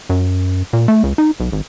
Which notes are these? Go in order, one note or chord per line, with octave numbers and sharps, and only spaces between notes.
F#2
A#2
A3
C#2
D#4
B1
G#1